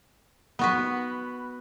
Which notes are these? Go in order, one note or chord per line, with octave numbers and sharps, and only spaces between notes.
B3 F#4 B4